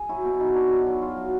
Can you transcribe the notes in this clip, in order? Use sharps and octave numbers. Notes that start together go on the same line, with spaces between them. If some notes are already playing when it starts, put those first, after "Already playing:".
Already playing: G#4
F#3 E4
B2
F#3 D#4
F#3 D4
F#3 D#4
F#3 E4
F#3 F4
F#3